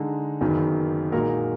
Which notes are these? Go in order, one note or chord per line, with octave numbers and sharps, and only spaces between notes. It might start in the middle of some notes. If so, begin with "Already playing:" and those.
Already playing: D3 G#3 D#4
F#1 F#2 D#3 F#3 B3
A#2 G#3 D#4 F#4 A#4